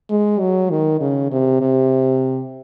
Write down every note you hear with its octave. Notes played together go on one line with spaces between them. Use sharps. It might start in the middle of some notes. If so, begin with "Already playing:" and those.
G#3
F#3
D#3
C#3
C3
C3